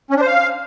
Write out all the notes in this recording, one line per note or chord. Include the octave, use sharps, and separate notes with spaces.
C#4
D4
C5
F5